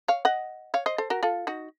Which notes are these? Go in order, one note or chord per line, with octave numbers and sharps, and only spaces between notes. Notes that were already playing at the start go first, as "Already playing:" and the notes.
C#5 F5
D#5 F#5
C#5 F5
C5 D#5
A4 C5
F#4 A#4
F4 A4
D#4 F#4